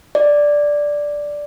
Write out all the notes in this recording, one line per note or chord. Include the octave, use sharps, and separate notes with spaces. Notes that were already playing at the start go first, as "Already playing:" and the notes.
D5